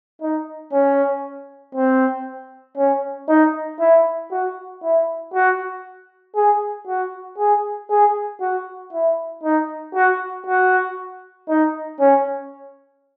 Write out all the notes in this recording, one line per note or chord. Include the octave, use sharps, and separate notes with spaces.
D#4
C#4
C4
C#4
D#4
E4
F#4
E4
F#4
G#4
F#4
G#4
G#4
F#4
E4
D#4
F#4
F#4
D#4
C#4